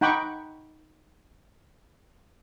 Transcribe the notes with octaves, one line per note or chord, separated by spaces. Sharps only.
D#4 F#5 G5 B5 C#6 D6